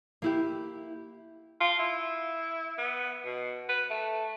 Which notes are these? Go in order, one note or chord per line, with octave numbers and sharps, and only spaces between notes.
A#3 E4 G4
F4
E4
B3
B2
B4
A3